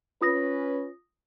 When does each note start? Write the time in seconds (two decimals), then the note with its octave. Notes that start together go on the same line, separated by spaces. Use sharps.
0.21 C#4 F4 B4 D#6 A#6